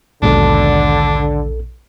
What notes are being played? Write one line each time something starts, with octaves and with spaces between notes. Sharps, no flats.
A#1 D#2 G#2 B2 D3 D4 A4